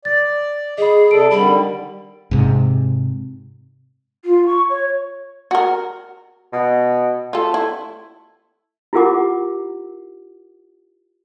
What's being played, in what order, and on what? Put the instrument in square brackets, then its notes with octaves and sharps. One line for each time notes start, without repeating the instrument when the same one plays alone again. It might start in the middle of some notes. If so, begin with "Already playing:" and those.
[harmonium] D5 [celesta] A6
[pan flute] G#4 [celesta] D#5 B5
[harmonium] C3 A4 [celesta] D5 D7
[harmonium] D3 D#3 G3 [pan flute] B5
[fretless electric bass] G#2 C3
[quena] F4
C#6
C#5
[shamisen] F#4 A#4
[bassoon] B2
[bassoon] A3 [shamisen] F4 A4
[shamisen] E4
[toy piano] E4 F4 G4 A#4 F#5 D6